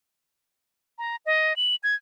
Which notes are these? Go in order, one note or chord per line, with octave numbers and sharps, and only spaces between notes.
A#5
D#5
F#7
G#6